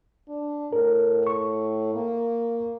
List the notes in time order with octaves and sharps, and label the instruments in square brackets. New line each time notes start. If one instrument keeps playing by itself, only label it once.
[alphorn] D4
[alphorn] A2 [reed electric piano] A#4
[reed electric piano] C#6
[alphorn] A#3